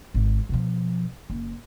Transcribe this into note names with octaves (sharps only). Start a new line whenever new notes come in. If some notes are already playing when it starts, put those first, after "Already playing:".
G#1
B2 F3
F#1